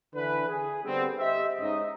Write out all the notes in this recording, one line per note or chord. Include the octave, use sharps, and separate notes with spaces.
D3 E3 B4
G#4
D3 G3 B3 C4
G4 C5 D#5 E5
G#2 C#4 D#4 C5 D#5